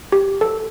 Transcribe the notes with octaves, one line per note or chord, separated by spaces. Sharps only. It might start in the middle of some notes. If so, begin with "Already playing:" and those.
G4
A4